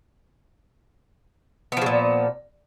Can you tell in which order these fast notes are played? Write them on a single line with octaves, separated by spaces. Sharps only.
B3 F3 C#3 A#2